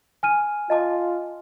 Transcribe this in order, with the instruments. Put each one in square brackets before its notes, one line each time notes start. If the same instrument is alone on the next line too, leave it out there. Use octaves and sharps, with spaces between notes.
[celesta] G#5 F6 D#7
[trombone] F4 [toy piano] D#5 A5 D6